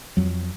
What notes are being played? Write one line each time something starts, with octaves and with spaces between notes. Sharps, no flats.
F2 F#3